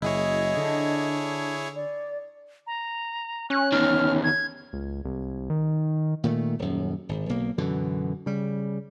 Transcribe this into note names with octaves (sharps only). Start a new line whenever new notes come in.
F#1 E4 G#4 C#5 D#5
D3 D4
D5
A#5
C#4 F#6
E2 D#3 F6
G#6
C#2
C2
D#3
A#2 D#3 F3 A3
D#1 F#2
G#1
B1 A#3
F#2 B2 D3 E3
C#3 G3